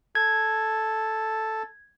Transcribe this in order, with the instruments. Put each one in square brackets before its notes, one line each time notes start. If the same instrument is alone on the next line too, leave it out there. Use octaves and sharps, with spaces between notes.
[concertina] A4 [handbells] G#6